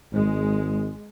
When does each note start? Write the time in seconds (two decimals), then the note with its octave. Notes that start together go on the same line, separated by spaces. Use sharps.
0.12 G#1 G#3